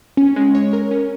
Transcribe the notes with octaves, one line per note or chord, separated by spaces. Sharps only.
C#4
G#3
C#5
A#4
C#4